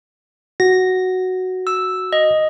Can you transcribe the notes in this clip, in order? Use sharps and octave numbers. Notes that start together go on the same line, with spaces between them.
F#4 A#6
E6
D#5